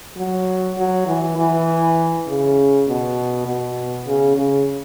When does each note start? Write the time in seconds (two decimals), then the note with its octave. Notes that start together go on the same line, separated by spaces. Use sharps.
0.17 F#3
0.78 F#3
1.07 E3
1.37 E3
2.28 C#3
2.88 B2
3.47 B2
4.07 C#3
4.37 C#3